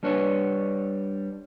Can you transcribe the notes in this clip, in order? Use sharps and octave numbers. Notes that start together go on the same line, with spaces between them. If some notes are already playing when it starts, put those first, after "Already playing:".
G3 D4 B4 C#5